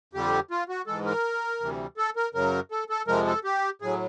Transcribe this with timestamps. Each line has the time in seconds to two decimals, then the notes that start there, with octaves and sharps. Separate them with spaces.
0.13 F2 D3 G3 G4
0.51 F4
0.69 F#4
0.87 G#2 E3 G#3 A4
1.06 A#4
1.60 D2 C3 E3 G3
1.97 A4
2.16 A#4
2.34 F#2 C#3 F#3 A#4
2.71 A4
2.90 A4
3.07 F2 C3 F3 G#3 A#4
3.26 A4
3.44 G4
3.82 A2 F#3 G#4